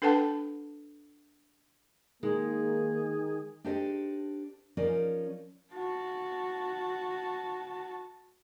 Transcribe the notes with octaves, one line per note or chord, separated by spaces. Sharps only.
D4 A4 B4 F#5 G5 A5
D#3 G#3 A#3 G#4
D4 D#4 G4 A4 C5 D#5
F3 C#4 D#4 A#4 D5
F#4 A5